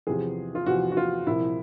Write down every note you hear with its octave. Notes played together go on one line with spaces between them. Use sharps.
E2 C3 F3 G#4
F4
E2 C3 F3 F#4
F#4
F4
C2 A#2 F3 E4